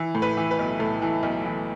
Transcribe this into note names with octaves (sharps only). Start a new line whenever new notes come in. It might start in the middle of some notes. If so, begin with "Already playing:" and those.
Already playing: E3
A2
B4
E3
B4
B1
A2 A4
E3
B1
E3